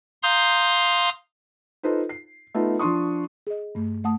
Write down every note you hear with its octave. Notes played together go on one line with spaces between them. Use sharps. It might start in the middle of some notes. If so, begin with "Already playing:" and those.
F5 A#5 C6 D#6 G6
D#4 F4 A4 B4 C5
C7
A3 B3 D#4 F4 A4
F3 D4 C6 C#6 D#6
G#4 D#5
G2 A3
A3 F#5 A5 D#6